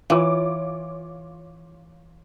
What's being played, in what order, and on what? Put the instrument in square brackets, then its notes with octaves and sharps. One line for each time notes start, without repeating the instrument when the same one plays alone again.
[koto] E3 [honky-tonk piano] F4 C#5 D6